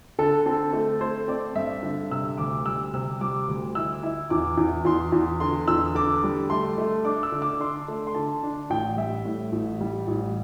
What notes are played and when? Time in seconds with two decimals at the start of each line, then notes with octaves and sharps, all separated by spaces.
0.19 D3 A4
0.46 C4 A4
0.73 A3
1.01 A3 C5
1.28 C4 D5
1.55 G2 E5
1.83 D3
2.11 C3 E6
2.38 D2 D6
2.66 G3 E6
2.94 C3 E6
3.21 G3 D6
3.48 D2
3.75 E4 E6
4.03 E4
4.30 E2 D6
4.57 E2
4.85 E2 C6
5.12 E2
5.40 D3 C6
5.68 E2 E6
5.95 D3 D6
6.24 G3
6.50 A3 C6
6.78 A3
7.05 D4 D6
7.23 E6
7.32 D3
7.42 D6
7.60 D4 C6
7.88 A3
8.07 C6
8.15 D3 A5
8.43 D4
8.70 A1 G5
8.97 G3 E5
9.25 A2
9.52 A1
9.81 G3
10.08 A1